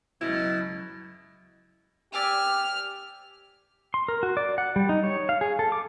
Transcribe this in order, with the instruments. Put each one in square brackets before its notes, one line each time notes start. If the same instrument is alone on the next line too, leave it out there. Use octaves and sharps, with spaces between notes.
[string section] C#2 F#2 [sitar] B2 [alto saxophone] E4
[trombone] G4 [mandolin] D5 E5 G#5 [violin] F6
[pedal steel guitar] C6
A#4
F#4
D5
F#5
G3
D#4
C#5
F5
G#4
A4
D6